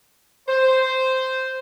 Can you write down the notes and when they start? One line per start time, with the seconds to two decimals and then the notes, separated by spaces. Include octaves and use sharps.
0.48 C5